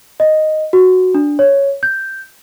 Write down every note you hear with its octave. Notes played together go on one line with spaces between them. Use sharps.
D#5
F#4
D4
C#5
G6